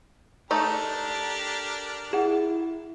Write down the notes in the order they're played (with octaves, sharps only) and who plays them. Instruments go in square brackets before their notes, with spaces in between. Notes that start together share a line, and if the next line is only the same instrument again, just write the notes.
[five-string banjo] A3 D#4 A4 [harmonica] D4 G4 A#4
[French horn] E4 [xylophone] G#4 F#5